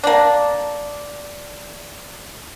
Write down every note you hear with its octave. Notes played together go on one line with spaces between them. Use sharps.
A#3 D4